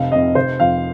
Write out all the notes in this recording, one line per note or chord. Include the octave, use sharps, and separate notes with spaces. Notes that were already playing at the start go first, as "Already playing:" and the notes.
Already playing: F1 F5
F2 C3 D#5
F1 C5
F2 F3 F5